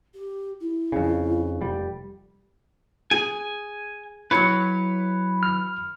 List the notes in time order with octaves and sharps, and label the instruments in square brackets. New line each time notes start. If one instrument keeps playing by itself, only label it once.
[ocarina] G4
E4
[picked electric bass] F2 C#3
F1 G3
[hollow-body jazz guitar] G#4 [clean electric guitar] G#5
[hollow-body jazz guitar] F#3 E4 [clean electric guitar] B4 C#5
[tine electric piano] F6